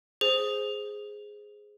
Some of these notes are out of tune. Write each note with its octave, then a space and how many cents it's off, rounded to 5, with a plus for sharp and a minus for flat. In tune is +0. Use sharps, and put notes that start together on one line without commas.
G#4 +0 C5 +0